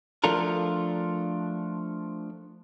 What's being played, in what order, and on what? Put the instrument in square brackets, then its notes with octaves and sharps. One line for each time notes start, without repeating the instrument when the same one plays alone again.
[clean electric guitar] F3 A3 D4 F4 A4 A#4